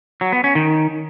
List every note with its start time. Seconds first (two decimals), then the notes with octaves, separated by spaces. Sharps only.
0.21 F#3
0.33 B3
0.44 C#4
0.55 D#3